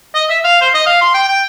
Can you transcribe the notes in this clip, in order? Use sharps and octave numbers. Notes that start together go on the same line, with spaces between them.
D#5
E5
F5
C5
D#5
F5
C6
G5
G5